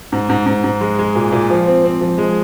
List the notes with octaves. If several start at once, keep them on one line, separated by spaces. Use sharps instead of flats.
G#2
G#2
G#2
G#2
G#3
G#3
A#2
A#2
F3
C4
C4
F3
G#3